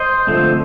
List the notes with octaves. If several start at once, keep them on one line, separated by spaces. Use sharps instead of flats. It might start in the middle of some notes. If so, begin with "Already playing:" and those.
Already playing: C5 D#5
D3 F3 A3 C4